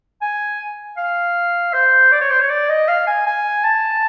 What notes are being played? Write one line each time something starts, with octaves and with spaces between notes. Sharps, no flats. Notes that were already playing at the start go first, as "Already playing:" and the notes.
G#5
F5
C5
D5
C#5
C5
C#5
D5
D#5
F5
G#5
G#5
A5